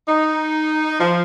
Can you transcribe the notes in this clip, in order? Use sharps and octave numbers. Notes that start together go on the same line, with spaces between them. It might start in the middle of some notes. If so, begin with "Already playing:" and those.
D#4
F3